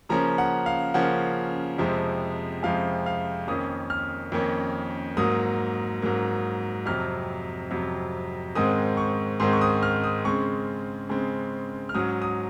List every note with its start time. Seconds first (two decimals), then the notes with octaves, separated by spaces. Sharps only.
0.09 C#3 F3 A#3 C#4 A#5
0.38 F#5
0.66 F5
0.94 C#3 F3 A#3 C#4 F#5
1.78 F2 C3 F3 G#3
2.63 F2 C3 F3 G#3 F5
3.06 F5
3.48 F2 D#3 A#3 C#4 D#6
3.90 F6
4.32 F2 D#3 A#3 C#4
5.17 G#2 F#3 A#3 D#6
6.02 G#2 F#3 A#3
6.86 F2 C3 F#3 F6
7.71 F2 C3 F#3
8.55 G#2 D#3 G#3 C4 D#6
8.97 C#6
9.40 G#2 D#3 G#3 C4 C6
9.53 C#6
9.61 D#6
9.83 F6
10.04 D#6
10.25 C#3 G#3 C4 C#6
11.09 C#3 G#3 C4
11.89 F6
11.95 G#2 F#3 C#4 D#6
12.22 D#6